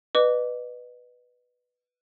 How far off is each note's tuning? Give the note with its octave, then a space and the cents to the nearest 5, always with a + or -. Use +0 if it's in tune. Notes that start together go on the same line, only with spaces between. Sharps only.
B4 +0 D#5 -35 D6 -20